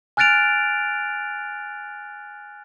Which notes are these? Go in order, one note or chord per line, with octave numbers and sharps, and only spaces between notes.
G#5 F6 F#6 A6 D7 F7